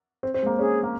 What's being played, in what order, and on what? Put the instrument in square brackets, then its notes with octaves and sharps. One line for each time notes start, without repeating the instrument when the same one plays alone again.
[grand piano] C4
C4
G#3
A#3
[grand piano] C#4 [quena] G#4
[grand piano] A#3